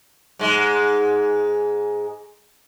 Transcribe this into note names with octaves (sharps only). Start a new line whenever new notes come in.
G#2 G#3